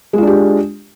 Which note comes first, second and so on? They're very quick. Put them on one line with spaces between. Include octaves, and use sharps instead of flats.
G#3 F4 D4 G4